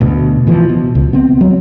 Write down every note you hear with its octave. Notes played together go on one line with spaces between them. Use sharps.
D2 B2
B2 E3 F3
B2
C#2
B3 C4
F#3